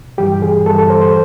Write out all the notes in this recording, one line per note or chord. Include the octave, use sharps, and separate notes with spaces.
G2 E3 G3 G4
G#4
G2 E3 G3 A4
A4
C5
C5